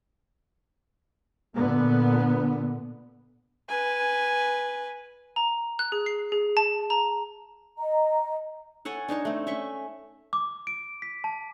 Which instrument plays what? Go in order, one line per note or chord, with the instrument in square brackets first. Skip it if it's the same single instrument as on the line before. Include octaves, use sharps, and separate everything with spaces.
[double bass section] A#2 D3 B3
[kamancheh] B4 G#5
[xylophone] A#5
F#6
G#4
C7
G#4
A5
A#5
[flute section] D#5 A#5
[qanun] A4 C#5 F#5 G#5
D4 D#4 C#5 A5
A3 C4
C#4 E5 C#6
[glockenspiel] D6
D7
B6
A5